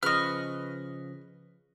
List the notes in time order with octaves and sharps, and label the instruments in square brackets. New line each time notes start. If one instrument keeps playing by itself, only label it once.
[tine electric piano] C#3 F3 [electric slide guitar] B4 D#5 [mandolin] C#6 F6